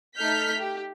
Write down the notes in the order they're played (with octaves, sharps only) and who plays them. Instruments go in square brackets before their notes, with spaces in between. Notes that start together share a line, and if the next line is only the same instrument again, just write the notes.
[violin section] A3 D#4 A4 F6 G6 B6
G4